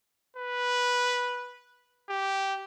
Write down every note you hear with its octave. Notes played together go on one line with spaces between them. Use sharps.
B4
G4